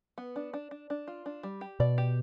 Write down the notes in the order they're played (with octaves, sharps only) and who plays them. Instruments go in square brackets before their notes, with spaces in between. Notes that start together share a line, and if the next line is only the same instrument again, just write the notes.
[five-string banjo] B3
D4
D4
D4
D4
F4
D4
G3
G4
[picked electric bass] B2 [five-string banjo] D5
[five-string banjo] G4